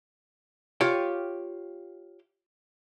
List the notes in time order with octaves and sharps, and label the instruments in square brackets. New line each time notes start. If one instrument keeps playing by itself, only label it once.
[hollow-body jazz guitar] F4 G4 C#5 G5